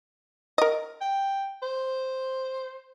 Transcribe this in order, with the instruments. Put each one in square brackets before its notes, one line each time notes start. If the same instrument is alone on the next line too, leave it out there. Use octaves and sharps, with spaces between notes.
[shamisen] A#4 D#5
[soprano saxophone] G5
C5